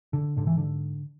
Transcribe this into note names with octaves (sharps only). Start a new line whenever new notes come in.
D3
G#2 D3
E3
D3